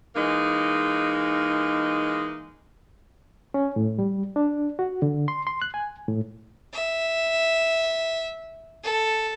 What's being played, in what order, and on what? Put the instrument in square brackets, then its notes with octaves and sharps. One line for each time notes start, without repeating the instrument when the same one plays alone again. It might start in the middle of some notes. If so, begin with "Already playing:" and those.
[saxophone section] E3 G#3 A#3 D#4
[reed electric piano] C#4
A2
G3
D4
F#4
D3
C6
C6
F#6
G#5
A2
[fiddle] E5
A4